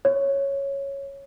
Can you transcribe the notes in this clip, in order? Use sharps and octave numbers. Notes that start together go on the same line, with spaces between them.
C#5